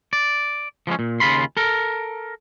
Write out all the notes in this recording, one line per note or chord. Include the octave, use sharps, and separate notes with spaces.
D5
F3 G3 G#3 C#4
A#2
D#2 C#3 F4 B5 C6
A4 A#4